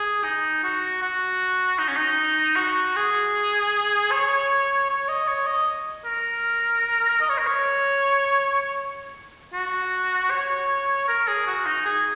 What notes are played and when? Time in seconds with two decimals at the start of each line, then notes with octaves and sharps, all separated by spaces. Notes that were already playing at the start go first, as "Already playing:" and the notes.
Already playing: G#4
0.24 D#4
0.63 F#4
1.02 F#4
1.79 D#4
1.88 C#4
1.97 D#4
2.56 F#4
2.96 G#4
4.11 C#5
4.89 C#5
5.08 D#5
5.27 C#5
5.47 D#5
6.05 A#4
7.21 D#5
7.29 C#5
7.38 A#4
7.47 C#5
9.54 F#4
10.30 C#5
11.08 A#4
11.28 G#4
11.47 F#4
11.66 D#4
11.85 G#4